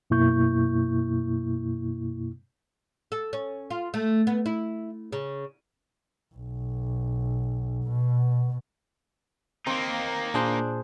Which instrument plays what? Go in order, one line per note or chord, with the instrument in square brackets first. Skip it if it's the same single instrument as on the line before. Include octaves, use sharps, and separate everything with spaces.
[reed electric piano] F#2 B2 A#3 E4 C#6 G6
[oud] A4
C#4
F4
A3
B3
E4
C#3
[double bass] B1
B2
[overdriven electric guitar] A#3 D#4 [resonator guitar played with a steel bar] C4
[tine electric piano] A#2 G#4 C5 [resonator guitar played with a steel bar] D4